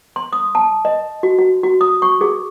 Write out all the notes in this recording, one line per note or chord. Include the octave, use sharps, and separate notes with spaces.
C6
D#6
A5
D#5
F#4
F#4
F#4
D#6
C#6
G#4